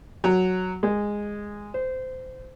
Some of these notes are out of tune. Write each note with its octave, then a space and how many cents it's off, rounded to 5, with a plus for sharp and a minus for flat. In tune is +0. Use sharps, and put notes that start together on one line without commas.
F#3 +0
G#3 -10
C5 -20